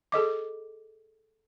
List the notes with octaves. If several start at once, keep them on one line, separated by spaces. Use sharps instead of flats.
G#4 A4 D#5 D6